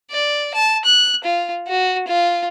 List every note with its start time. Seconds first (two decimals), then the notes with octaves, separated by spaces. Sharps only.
0.11 D5
0.54 A5
0.85 F#6
1.24 F4
1.68 F#4
2.08 F4